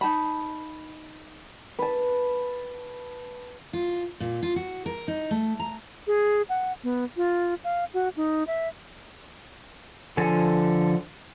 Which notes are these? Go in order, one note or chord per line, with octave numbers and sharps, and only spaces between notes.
D#4 A5 B5
B4 A5
F4
A#2
F4
F#4
A#4
D#4
A3
A#5
G#4
F#5
B3
F4
F5
F#4
D#4
E5
D3 F3 A4 G#5